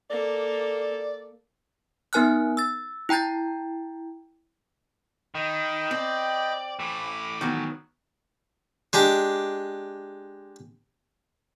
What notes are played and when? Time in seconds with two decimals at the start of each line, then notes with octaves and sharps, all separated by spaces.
0.10 A#3 A4 D5
2.13 B3 D#4 A#4 G#5 F6 F#6
2.57 E6 A6
3.09 E4 G5 A#5 G6 A6
5.35 D#3 D#5 G5 B5
5.91 C4 D5
6.79 E3 A3 B5 D6
7.41 D#3 F#3 B3
8.93 G#3 D4 G4